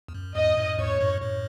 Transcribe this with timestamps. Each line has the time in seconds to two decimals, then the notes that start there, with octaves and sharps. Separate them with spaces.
0.08 E2
0.14 F#2
0.35 E2 G#2 D#5
0.57 F#2 A2
0.78 E2 G#2 C#5
1.01 F#2 A2
1.21 F#2 A2